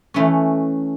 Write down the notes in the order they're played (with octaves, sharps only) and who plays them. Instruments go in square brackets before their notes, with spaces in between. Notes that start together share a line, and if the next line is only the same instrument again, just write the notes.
[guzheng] E3 A3 C#4